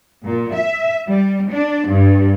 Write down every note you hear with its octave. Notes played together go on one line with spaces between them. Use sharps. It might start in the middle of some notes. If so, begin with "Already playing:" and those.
A#2
E5
G3
D4
G2